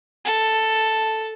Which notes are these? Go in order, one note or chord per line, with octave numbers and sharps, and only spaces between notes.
A4